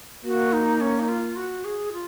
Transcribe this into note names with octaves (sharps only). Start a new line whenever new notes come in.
A#3 F#4
D#4
C#4
D#4
F4
F#4
G#4
F4